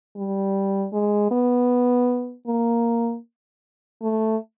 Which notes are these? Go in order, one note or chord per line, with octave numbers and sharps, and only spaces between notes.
G3
G#3
B3
A#3
A3